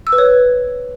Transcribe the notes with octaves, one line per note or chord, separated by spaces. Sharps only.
E6
B4
C#5